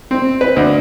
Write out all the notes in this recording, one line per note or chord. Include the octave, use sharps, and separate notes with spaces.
C4
B4
D2